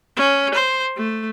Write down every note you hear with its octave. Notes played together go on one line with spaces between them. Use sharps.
C#4
C5
A3